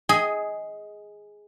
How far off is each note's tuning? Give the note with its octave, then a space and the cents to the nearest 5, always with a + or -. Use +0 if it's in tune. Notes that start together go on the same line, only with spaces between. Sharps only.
G#4 +0 D#5 +20